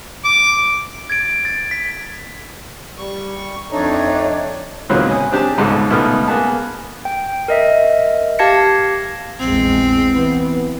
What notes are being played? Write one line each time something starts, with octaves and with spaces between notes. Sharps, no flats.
D6
G#6 A6 D7
A6
B6
G3 C#6
F2 A3 D4 D#4 C#5
C#2 A#2 D#3 F#3 B3 C4
C#4 G#5 D#6
C4 D4 G4 G#4 A5
C#2 G#2 B2 D#4 A4
C#2 B2 A3 B3 D#4 F6
A#3 B3 G#4 A5
G5
A#4 D#5 E5
G4 F5 A5 G#6 A#6 C#7
A#1 E2 G#3 C4
E3 B3